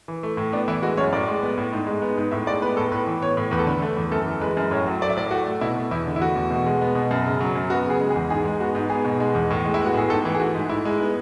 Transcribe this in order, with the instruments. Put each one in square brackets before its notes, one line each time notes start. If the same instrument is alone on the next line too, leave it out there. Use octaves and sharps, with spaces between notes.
[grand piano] E3
A3
A2
B3 D4
E3 E4
G#3 F#4
F#2 C#5
A2 D5
G#3
B3
A2
G#2
G#3
B3
G#2
A2 E5
G#3 D5
B3 B4
A2 A4
A2 B4
E3
B3 C#5
A2
E2 B4
A4
D3 B4
A3
E2
F#2 A4
E3
G#3 B4
F#2
A2 C#5
F#3
A3 D5
E5
A2 D5
A3 F#4
A3
B2 E4
B2
E2 E4
D3
E4
A3 F#4
E2
B2
G#3
B3
B2
F#2
C#3
F#3
F#2
B3 F#4
C#3 G#4
G#3
G#4
E2
G#2 G#4
G#3
B3 F#4
G#2
B3 G#4
B2
G#3
E2
A2
G#3
E4
B3
F#4
A2 G#4
G#2 A4
E3
G#4
A3 F#4
G#2
G#2 E4
G#3
B3